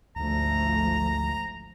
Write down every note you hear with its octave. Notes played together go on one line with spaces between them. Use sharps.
G#1 D2 F3 A3 A#5